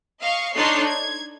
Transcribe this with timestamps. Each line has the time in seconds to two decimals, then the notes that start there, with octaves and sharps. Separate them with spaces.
0.22 D#5 F5 C#6
0.56 D4 D#4 A4 C#5 C6 C7
0.87 G#6